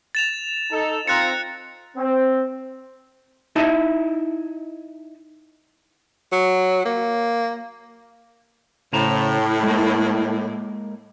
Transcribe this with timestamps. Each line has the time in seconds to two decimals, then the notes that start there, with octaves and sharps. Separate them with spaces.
0.15 A6 E7 F7
0.72 D#4 A4
1.07 C4 F4 A#5 F#6 A6 C#7
1.96 C4
3.56 D#4 E4 D#5 E5 A5
6.32 F#3
6.85 A#3
8.93 A2 C#3 C5 A#5
9.63 G#3 A#3